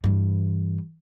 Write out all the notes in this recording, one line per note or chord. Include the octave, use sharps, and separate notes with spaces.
G2 E3